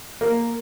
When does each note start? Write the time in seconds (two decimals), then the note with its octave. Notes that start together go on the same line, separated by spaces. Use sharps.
0.21 A#3